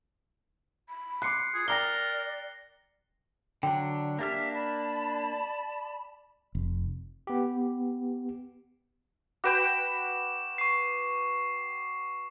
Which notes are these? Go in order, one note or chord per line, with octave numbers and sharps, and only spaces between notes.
B5
C6 D6 F#6 C7 C#7
F4 G#4
A#4 D5 G5 A#5 D6 A#6 G7
D3 F#3 D4 G5
A#3 D4 G4 E5 F6
D5 A5 B5
F1
B3 G4
F#4 B4 G5 D6 E7
C#6 C7